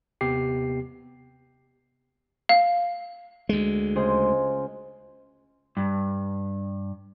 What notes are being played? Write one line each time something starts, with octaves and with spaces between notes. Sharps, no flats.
D#2 C3 B3 G4 C7
F5
D2 G#3
C#2 G#4 C5
G2